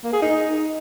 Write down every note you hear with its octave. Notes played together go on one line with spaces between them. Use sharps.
A#3
G#4
D#4